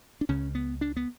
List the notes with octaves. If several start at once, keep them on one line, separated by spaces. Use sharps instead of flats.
D4
C#2 C#3 C#4
B3
D4
B3